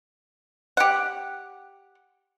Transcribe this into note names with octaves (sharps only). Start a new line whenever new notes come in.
G4 F#5